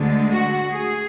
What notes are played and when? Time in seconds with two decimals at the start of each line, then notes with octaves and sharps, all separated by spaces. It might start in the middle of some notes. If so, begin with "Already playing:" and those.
Already playing: D2 D3 G#3
0.31 F#4
0.73 G#4